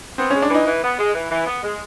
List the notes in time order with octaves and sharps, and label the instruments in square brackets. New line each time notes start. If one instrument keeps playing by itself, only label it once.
[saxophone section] B3 [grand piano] C4
[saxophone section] G#3 [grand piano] C#4
[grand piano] D4
[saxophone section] E3 [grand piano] D#4
[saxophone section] E3
B3
G#3
E3
E3
B3
G#3